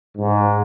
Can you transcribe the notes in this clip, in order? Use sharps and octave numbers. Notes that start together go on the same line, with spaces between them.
G#2